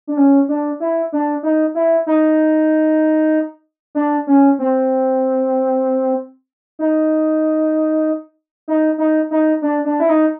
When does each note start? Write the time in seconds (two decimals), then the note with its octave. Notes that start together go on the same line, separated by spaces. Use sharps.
0.07 D4
0.17 C#4
0.48 D4
0.80 E4
1.12 D4
1.43 D#4
1.75 E4
2.06 D#4
3.95 D4
4.27 C#4
4.59 C4
6.79 D#4
8.68 D#4
8.98 D#4
9.31 D#4
9.62 D4
9.85 D4
10.00 E4
10.09 D#4